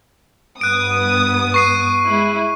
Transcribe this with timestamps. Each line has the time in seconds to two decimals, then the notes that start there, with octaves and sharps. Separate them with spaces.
0.61 G2 B3 D#6 F#6 D7
1.54 C#6 C7 D#7
2.06 G#3 E4